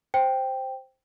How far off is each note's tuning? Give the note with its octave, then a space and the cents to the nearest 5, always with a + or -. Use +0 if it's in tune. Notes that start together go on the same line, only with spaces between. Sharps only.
C5 +0 G5 +0